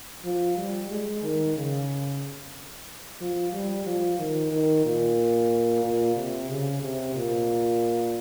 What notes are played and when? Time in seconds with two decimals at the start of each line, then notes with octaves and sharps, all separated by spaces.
0.24 F3
0.57 G3
0.90 G#3
1.23 D#3
1.56 C#3
3.21 F3
3.53 G3
3.86 F3
4.19 D#3
4.52 D#3
4.86 A#2
5.84 A#2
6.16 C3
6.50 C#3
6.82 C3
7.15 A#2